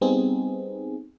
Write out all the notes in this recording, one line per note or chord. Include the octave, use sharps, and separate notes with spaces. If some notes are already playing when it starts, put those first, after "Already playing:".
G3 B3 C4 D#4 G#4